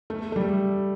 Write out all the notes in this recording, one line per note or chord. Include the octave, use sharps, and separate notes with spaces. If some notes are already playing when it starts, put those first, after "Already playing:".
A3
A3
G3